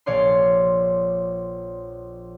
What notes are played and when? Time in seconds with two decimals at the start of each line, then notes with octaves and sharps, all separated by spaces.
0.06 A#1 C#5 D5 F5 C6